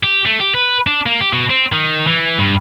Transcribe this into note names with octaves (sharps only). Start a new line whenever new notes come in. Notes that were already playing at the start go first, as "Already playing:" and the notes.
G4
A3
G4
B4
D4
A#3
G4
B2
C4
D#3
E3
G2